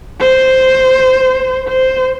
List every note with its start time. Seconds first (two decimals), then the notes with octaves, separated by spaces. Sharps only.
0.21 C5
1.69 C5